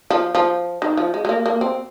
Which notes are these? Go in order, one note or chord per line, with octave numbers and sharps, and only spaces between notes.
F3
F3
D#3
F3
G#3
G#3
A#3
A#3
C4